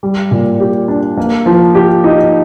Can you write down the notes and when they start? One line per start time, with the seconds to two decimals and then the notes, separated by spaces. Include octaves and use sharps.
0.03 G3
0.31 A#2
0.60 G4
0.88 D4
1.18 A#3
1.46 F3
1.75 G4
2.04 D#4